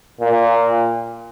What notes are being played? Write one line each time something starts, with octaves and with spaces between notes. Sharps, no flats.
A#2